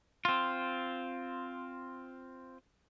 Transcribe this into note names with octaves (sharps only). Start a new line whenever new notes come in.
C4 F4